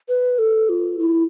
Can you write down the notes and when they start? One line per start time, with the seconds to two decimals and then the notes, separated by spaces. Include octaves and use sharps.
0.08 B4
0.38 A4
0.69 F4
0.99 E4